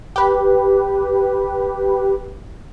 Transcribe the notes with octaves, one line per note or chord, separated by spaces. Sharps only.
G4 B4